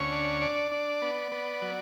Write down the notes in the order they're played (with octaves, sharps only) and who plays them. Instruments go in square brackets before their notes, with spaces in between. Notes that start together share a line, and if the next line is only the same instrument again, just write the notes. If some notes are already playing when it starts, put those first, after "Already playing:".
Already playing: [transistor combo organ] D2 C#4 C#5
D4
D4 D5
D4
B3
B3
F#3